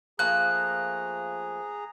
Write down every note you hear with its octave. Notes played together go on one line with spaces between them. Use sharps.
F3 A3 A#3 G#4 A#5 F#6